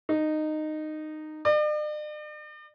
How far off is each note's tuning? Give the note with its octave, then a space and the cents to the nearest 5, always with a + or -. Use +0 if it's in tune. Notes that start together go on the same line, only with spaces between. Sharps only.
D#4 -15
D5 +45